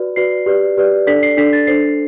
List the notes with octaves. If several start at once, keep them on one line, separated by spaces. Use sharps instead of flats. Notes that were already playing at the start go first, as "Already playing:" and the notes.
Already playing: F#4 B4 D5
F#4 B4 D5 C7
G4 B4 D5
G4 B4 D5
D4 A4 D5 B6
C7
D4 A4 D5 B6
A6
D4 A4 C5 C7